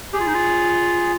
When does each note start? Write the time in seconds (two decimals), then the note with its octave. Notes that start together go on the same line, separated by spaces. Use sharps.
0.13 G4 G#4
0.20 F4
0.27 D#4
0.34 F4